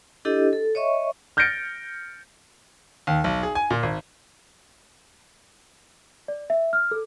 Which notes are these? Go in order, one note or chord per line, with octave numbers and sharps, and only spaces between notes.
D4 E4 G4 A4 D#5
A4
C#5 D#5 E5 C#6
F6 G6 A6 A#6 C#7 D7
D#2
B1
G#4
G#5
A#2
G#1
D5
E5
F6
A4